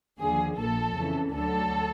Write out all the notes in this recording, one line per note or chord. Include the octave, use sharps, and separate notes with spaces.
D#2 D3 F3 G#4
A#1 A#2 F3 A4
F2 C#3 E3
D2 D3 F#3 A4